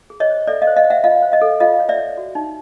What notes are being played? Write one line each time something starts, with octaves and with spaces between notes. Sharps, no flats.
G#4
C#5 D#5
C5
A4 D5 E5
D#5 F5
C5
D#5 F5
C5
E5 F#5
F4 D#5 F5
C5
D#5 F5
A4
F4 D#5 F5
C#5
D5 E5
C#5
F#4
D#4